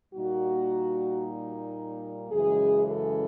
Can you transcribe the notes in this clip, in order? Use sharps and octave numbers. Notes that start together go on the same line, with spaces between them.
A#2 G3 A#3 D#4 F#4
F#2 C#3 E3 G#3 G#4
A4